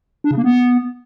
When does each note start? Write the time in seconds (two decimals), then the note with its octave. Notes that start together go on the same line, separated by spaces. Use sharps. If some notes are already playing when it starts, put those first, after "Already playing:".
0.24 D4
0.31 C#3
0.37 A#3
0.44 B3